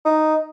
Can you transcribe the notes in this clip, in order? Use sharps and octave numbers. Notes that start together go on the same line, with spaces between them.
D#4